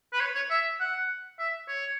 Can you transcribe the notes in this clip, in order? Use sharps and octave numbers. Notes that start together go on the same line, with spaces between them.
B4
C#5
C#5
E5
F#5
E5
C#5